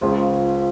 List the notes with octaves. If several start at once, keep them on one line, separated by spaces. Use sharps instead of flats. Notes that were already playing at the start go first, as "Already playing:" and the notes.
C#2 C#3 F3 G#3